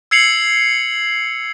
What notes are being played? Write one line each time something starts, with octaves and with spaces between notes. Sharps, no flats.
E6 G#6 C7 C#7 F7 F#7